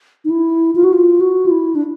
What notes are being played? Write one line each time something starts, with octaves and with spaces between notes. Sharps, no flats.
D#4
E4
F4
F#4
F4
F#4
F4
E4
D4